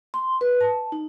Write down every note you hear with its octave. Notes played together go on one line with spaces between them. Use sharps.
C6
B4
A5
D#4